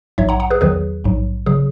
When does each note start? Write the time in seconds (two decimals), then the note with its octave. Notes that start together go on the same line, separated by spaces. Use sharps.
0.18 A#1 G#2 F#3 C#5 E5
0.29 F#5 A#5
0.40 F#5 A#5
0.50 G#4 B4
0.61 E2 D#3 F#3 G#4 B4
1.04 A#1 G#2 F#3
1.46 C#3 F#3 G#4